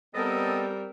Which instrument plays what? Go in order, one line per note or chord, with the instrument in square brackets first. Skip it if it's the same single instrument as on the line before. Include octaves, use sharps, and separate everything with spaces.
[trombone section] G3 [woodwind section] B3 A4 [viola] C4 A#4 [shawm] D#5